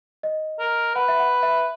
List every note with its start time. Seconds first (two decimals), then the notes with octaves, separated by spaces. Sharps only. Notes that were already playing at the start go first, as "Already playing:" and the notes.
0.23 D#5
0.59 A#4
0.95 B4 F#5
1.08 E5
1.19 F#5
1.43 E5